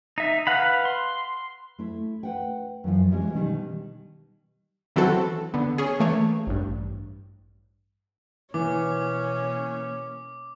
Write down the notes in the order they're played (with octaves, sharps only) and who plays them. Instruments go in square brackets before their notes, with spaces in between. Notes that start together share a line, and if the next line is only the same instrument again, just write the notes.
[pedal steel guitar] D#4 E5
B4 F5 F#5 B5
C6
[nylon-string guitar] A3 E4
B4 F#5 G5
F#2 E3 F3
E3 G3 G#3 C#4
B2 D#3 G3
[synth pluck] D#3 E3 F#3 C4 F#4 A4
D3 B3
C#4 G#4
E3 A3 A#3 C#5
A1 G2
[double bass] B2 A#3 [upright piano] E3 [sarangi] C#4 [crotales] D6